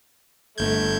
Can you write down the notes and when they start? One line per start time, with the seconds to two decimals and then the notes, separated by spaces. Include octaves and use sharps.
0.58 G1 A3 G6 G#6